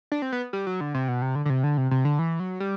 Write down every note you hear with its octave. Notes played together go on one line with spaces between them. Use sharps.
D4
C4
B3
G3
F#3
D3
C3
B2
C3
D3
D3
C3
D3
C3
C3
D3
E3
F#3
G3